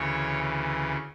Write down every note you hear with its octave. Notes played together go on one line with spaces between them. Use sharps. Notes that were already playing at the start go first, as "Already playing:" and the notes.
Already playing: D2 C#3 E3 C#5